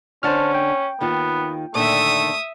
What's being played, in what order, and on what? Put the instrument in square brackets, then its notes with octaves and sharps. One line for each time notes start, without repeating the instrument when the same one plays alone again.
[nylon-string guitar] D3 D4 F#5 [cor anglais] C#4 [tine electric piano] C5 A5 F6
[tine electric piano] G5
[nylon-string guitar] D#2 D#3 F4 [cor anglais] B3
[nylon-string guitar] A#2 D3 D#3 [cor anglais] A3 [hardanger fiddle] E5 D#6